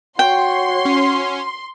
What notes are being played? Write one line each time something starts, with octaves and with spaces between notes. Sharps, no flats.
F#4 C#5 G5 C6
C#4